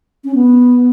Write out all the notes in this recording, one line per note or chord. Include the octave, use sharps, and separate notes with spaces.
C#4
B3